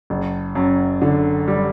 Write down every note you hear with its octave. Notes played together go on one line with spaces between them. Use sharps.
F#1
F#2
D3
G3